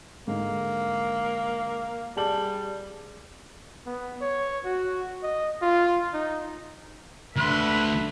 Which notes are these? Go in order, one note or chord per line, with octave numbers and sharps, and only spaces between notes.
G#2 D3 A#3
G3 G#4 A5 F#7
B3
C#5
F#4
D#5
F4
D#4
D2 D3 B4 E5 C6